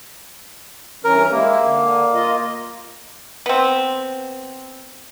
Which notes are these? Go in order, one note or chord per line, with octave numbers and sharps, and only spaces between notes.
G2 E3 C#4 A#4
G#3 A#3 E4
D3
F4 D#5
B3 C4